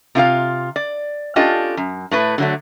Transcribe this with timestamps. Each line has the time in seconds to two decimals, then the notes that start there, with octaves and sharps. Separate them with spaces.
0.15 C3 F4 A#4 F5
0.76 D5
1.36 C#4 D4 F4 G4 A4 D#5
1.77 F#2
2.11 A2 A3 B4
2.38 D3 F#3 A3